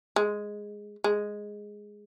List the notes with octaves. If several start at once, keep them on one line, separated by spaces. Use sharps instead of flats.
G#3
G#3